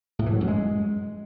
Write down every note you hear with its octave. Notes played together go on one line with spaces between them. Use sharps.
A2
E3
F#3
F#2
G#3